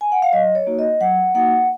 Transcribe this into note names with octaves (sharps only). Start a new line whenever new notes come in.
G#5
F#5
F5
F#3 D#5
C#5
A#3 D#4 F#4
D#5
F#3 F#5
A#3 D#4 F#4 F#5